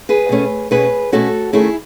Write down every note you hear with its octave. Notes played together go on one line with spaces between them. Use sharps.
G#4 B4
B2 A3 C#4
B2 A3 C#4 G#4 B4
B2 A3 C#4 F#4 A4
D#3 A3 C#4 E4 G#4